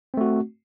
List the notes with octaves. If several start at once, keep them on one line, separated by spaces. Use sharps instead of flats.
A3 C4 F#4